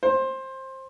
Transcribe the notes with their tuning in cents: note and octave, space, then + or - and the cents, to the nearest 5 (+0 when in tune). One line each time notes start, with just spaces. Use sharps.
C5 +20